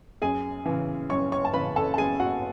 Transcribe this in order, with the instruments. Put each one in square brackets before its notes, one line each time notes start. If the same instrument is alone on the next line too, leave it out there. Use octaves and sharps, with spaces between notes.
[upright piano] F#2 G#4 G#5
C#3 E3
F#2 C#5 C#6
C#5 C#6
A5
C#3 E3 B4 B5
A4 A5
A5
F#2 G#4 G#5
F#4 F#5